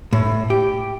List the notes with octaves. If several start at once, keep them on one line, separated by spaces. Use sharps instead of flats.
A2
G4